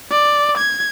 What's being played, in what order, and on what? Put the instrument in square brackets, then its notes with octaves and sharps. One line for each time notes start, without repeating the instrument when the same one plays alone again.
[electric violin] D5
G#6